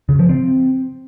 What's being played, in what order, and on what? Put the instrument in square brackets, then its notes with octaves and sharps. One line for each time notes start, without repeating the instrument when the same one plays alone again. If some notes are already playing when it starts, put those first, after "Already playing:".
[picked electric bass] C#3
F3
C4